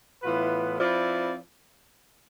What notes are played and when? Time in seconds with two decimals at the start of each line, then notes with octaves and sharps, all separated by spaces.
0.23 A2 E3 B3 F4 B4
0.79 F3 C4 E4 B4 D5